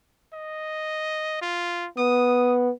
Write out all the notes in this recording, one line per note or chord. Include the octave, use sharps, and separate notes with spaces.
D#5
F4
B3 D#6